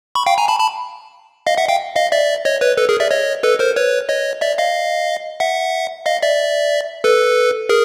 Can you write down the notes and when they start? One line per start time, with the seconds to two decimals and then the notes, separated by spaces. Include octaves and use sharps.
0.15 B5 C#6
0.26 F5 G5
0.38 G#5 A#5
0.48 A5 B5
0.59 A5 B5
1.47 D#5 F5
1.57 E5 F#5
1.68 F5 G5
1.96 D#5 F5
2.12 D5 E5
2.45 C#5 D#5
2.61 B4 C#5
2.78 A4 B4
2.89 G#4 A#4
3.00 D5 E5
3.11 C#5 D#5
3.43 A4 B4
3.59 A#4 C5
3.76 B4 C#5
4.09 C#5 D#5
4.41 D5 E5
4.58 D#5 F5
5.40 E5 F#5
6.06 D#5 F5
6.23 D5 E5
7.04 A4 B4
7.69 G#4 A#4